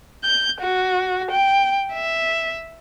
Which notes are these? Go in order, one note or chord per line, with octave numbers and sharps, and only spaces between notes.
G6
F#4
G5
E5